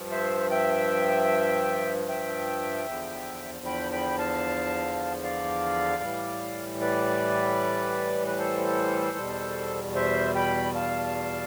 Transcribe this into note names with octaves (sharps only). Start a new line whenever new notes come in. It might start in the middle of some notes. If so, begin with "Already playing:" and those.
Already playing: G2 F3
C5 E5
E5 G5
E5 G5
E2 D3 F3
G5 B5
G5 B5
F5 A5
D5 F5
A2 E3 G3
B4 D5
B4
A4 C5
E2 B2 G3
C5 E5
G5 B5
F5 A5